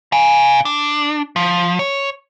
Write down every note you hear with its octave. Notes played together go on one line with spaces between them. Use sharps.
F5 G#5
D4
F3
C#5